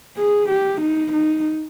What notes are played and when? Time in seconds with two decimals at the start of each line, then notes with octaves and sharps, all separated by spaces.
0.17 G#4
0.49 G4
0.81 D#4
1.12 D#4